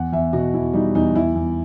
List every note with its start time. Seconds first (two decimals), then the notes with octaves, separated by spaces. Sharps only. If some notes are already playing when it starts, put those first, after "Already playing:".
Already playing: E2 F#5
0.12 E2 E5
0.33 B2 F#4
0.53 E2 E4
0.73 G3 D#4
0.95 E2 D#4
1.15 E2 E4
1.35 E2